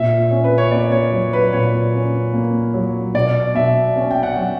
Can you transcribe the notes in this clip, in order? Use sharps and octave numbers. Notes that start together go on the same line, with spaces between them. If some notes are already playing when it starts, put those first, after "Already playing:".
Already playing: A#2 E5
C#4
B4
C#5
A#3 D5
C#5
F#3
B4
A#2 C#5
C#4
A#3
F#3
B2 D5
B2 E5
C#4
G5
F#5
F#3